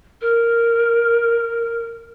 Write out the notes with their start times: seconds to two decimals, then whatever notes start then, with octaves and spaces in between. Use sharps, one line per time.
0.21 A#4